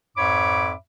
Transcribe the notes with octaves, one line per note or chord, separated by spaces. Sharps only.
F2 G#2 C#5 E5 B5 D6